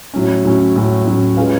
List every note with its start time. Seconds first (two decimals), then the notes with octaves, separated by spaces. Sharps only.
0.14 A2 F#3 C#4
0.45 A2 F#3 C#4
0.76 A2 F#3 C#4
1.06 A2 F#3 C#4
1.37 G#3 C#4 F4 B4 F5